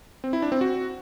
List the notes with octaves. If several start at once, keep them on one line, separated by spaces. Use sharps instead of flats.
C4
E4
D4
C4
F#4